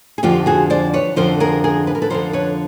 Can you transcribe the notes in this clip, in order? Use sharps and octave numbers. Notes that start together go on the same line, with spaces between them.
G#4
F2 D3 F3 F4 G4
F#4 G#4
C5 D5
B4 C#5
F2 D3 F3 A#4 C5
G#4 A#4
G#4 A#4
B4
A#4
A4 B4
F2 D3 F3 A#4 C5
B4 C#5